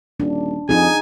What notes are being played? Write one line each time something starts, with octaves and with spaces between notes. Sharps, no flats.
D#1 D4
F2 D#4 G#4 G#5